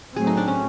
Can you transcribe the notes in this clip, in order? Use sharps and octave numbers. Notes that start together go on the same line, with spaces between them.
A2 F#3 A3 C4 G#4
D#4
D4
C#4